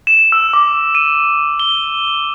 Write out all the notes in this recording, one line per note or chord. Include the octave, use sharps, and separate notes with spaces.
E7
E6
D6
D#7
G7